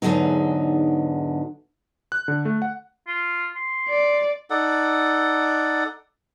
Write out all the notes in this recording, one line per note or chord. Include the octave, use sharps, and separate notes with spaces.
E2 G#2 D3 D#3 F#3 D#4
F#6
D3
A3
F#5
F4
C6
D5
D#4 A4 D5 F#5